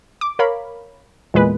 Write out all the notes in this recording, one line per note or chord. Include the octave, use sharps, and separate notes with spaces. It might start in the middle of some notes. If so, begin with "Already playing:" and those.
D6
A#4 C#5 F5 B5
E2 A#2 G#3 B4